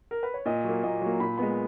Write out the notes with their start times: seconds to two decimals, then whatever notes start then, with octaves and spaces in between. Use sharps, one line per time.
0.11 A#4
0.23 B4
0.34 C#5
0.46 A#2 D#5
0.64 F#3
0.69 A#3
0.83 A#2 D#5
1.01 F#3 A#3
1.20 A#2 B5
1.38 G#3 B3 B5